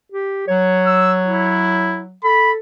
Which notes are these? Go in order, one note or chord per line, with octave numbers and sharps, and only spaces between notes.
G4
F#3 C#5
E6
E4
A4 B5